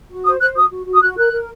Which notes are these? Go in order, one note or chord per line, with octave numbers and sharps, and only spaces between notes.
F#4
C5 D#6
C5 F#6
F#4 D#6
F#4
F#4
D#6
F#4 F#6
A#4 F#6
A#4